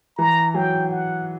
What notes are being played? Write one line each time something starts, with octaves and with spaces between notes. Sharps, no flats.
E3 A#5
F#3 G5
F#5